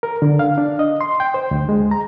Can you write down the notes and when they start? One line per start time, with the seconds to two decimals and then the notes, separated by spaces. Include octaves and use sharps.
0.03 A#4
0.22 D3
0.39 F5
0.58 D4
0.79 D#5
1.01 C6
1.20 G5
1.34 C5
1.51 D2
1.69 G#3
1.91 A#5